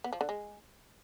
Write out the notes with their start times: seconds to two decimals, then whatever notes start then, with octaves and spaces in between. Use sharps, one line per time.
0.04 B3
0.13 F3
0.21 D3
0.29 G#3